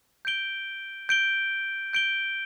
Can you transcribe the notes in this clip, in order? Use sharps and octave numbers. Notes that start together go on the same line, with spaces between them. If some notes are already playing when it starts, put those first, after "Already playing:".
G6 D7 G7
G6 D7 G7
G6 D7 G7